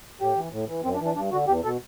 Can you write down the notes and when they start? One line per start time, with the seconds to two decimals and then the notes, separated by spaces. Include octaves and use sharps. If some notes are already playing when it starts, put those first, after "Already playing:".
0.21 A2 G4
0.36 E3
0.52 A2
0.68 E3
0.84 F#2 C4
0.95 D4
1.00 E3
1.05 D4
1.16 G2 D4
1.32 D3 F#4
1.48 E2 G4
1.64 B2 A4